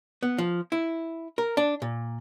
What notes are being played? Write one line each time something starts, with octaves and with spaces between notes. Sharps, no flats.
B3
F3
E4
A#4
D4
A#2